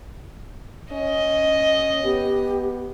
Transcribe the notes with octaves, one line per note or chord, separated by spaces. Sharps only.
C#4 D#5
B3 G4